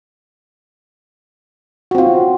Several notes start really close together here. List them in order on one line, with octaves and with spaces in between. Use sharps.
F#4 C4 F4